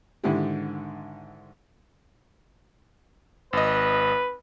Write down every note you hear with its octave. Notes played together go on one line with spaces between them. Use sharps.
G#2 D3 D#3 D4 E4 G4
G#1 B4 D#5